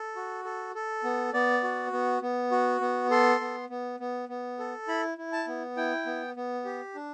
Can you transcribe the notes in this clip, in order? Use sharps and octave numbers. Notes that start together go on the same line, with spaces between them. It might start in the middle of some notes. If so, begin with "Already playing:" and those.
Already playing: A4
F#4
A4
A4
B3
B3 D5
F#4
B3
B3
F#4
B3
A4 C6
B3
B3
B3
B3
A4
E4 B5
E4
A5
B3
E4 G5
B3
B3
G4
D4